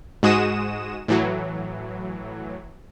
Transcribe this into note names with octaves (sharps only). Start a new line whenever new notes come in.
G#2 G#3 F#4 D#6 E7
A2 E3 F#3